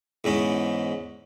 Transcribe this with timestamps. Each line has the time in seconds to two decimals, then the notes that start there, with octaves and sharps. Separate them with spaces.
0.24 E2 G#2 C#4